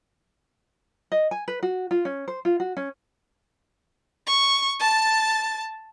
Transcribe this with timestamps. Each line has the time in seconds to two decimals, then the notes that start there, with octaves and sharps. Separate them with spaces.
1.12 D#5
1.31 G#5
1.48 B4
1.63 F#4
1.91 F4
2.05 C#4
2.28 C5
2.45 F4
2.60 F#4
2.77 C#4
4.26 C#6
4.80 A5 A6